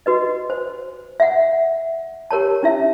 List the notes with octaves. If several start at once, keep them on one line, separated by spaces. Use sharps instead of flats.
F#4 B4 D#5
C5
E5 F#5
G4 A#4 C#5 A5
C#4 E4 E5